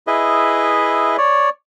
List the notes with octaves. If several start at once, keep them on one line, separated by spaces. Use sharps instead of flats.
E4 G#4 B4 D#5 E5
C#5 D5